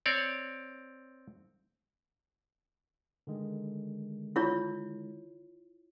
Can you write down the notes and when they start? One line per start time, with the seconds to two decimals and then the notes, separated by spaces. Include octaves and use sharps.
0.06 C4 C#5 D5
3.27 D3 D#3 G#3
4.36 E4 F4 C#5